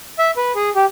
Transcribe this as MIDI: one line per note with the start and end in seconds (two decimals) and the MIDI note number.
0.19 0.31 76
0.37 0.52 71
0.55 0.70 68
0.75 0.85 67